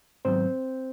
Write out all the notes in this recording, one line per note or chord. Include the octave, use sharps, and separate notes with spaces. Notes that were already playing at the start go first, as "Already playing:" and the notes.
G#2 D#3 F#3 B3 C4 C5